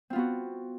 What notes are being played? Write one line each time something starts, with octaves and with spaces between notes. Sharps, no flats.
B3 C4 F4 F#4